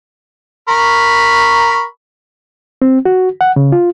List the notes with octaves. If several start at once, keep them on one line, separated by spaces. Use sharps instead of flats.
A#4 B5 C#6
C4
F#4
F#5
C#3
F4